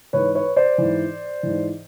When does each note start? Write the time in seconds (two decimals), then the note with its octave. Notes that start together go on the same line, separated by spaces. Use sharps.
0.13 G#2 E3 B4 C#5
0.35 B4 C#5
0.56 C5 D5
0.78 G#2 E3
1.43 G#2 E3